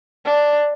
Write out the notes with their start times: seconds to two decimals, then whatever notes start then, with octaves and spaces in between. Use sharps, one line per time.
0.25 D4